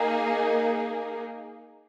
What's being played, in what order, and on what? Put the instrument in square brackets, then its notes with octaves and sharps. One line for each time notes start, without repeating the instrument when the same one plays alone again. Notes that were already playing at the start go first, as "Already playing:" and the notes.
Already playing: [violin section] A#3 D#4 G#4